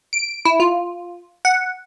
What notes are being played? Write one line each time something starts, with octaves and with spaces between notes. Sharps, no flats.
D7
E4
F4
F#5